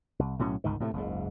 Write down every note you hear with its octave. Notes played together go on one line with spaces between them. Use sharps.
C2
B1 A2 F#3 C#4
G1 C#2 G#2 D#3
A2 C3 F3 A3
F#1 C#2 G#2